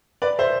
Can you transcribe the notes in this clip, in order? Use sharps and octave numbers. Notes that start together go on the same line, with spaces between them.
B4 D5
C5 E5